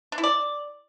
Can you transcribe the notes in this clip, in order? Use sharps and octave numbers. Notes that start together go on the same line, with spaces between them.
D4
E4
D5